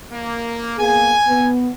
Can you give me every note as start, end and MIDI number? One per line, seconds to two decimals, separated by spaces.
0.11 0.75 58
0.78 1.11 58
0.78 1.11 59
0.78 1.11 68
0.78 1.47 80
1.27 1.70 59